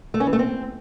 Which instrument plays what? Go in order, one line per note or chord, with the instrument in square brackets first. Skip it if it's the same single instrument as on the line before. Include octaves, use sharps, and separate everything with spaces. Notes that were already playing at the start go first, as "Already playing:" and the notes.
[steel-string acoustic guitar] A3
C#4
E3
A3
C4